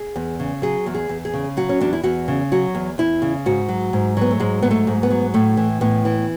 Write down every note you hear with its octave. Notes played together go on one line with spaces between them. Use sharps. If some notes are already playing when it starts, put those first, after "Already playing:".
Already playing: G#4
E2
C#3
F#3 G#4
E2
G#4
E2
G#4
C#3
F#3 F#4
C#4
E2 D4
E4
E2 F#4
C#3
F#3 F#4
E2
E2 E4
C#3
G#2 F#4
F#3
G#2
F#3 B3
A3
G#2 G#3
F#3 B3
A3
G#2
B3
F#3
A2 A3
E3
A2 B3
E3